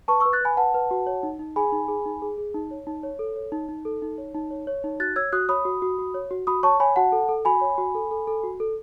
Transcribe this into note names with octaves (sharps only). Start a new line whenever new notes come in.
B4 A5 C#6
C#6 E6
B4
F#6 A6
B4 G#5 B5
B4 F#5 A5
B4
F#4
C#5
D#4
D#4
G#4 G#5 B5
D#4
G#4
D#4
G#4
G#4
D#4
C#5
D#4
C#5
A4
C#5
D#4
D#4
A4
D#4
C#5
D#4
C#5
C#5
D#4
F#4 F#6 A6
C#5 E6 G#6
F#4 D#6 F#6
C#5 B5 D#6
F#4
F#4
F#4
C#5
F#4
F#4 B5 D#6
C#5 A5 C#6
C#5 G#5 B5
F#4 F#5 A5
A4
A4
F#4 G#5 B5
C#5
F#4
A4
A4
A4
F#4
A4